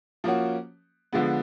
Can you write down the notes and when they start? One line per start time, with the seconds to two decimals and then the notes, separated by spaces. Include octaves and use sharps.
0.24 F3 A#3 C#4 F#4
1.13 D3 F3 G#3 B3